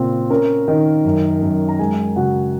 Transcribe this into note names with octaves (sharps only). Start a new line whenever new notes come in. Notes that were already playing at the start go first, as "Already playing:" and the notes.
Already playing: A#2 C#3 C4
C#4 A#4 A#5
D#3
F#2
F#2
A#5
G#3 G#4 G#5
C#3 F#4 F#5